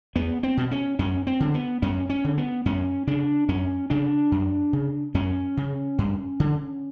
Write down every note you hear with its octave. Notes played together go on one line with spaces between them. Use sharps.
E2 B3
C4
B2
C#4
F#2 C#4
C4
D3
B3
F#2 C#4
C#4
D3
B3
F#2 C#4
C#3 D4
F#2 C#4
C#3 D4
F#2
C#3
F#2 C#4
C#3
G2
D3